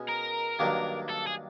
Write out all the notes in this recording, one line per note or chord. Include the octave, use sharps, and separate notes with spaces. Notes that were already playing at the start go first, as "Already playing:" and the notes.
Already playing: B2 G#3 C#4
A#4
G2 D#3 F#3 A#3 D4
A4
G#4